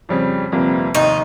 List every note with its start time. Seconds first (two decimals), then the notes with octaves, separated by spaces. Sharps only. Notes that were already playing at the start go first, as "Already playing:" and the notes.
0.09 F2 C#3 G3 C4
0.52 G1 F2 C3 G3 A#3
0.95 F1 D#2 D#3 D#4